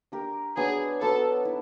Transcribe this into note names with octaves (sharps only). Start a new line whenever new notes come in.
D4 G4 A#4
F#3 B3 D4 G#4
F#3 B3 D4 A4
E4